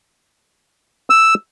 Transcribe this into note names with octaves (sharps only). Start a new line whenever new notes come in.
E6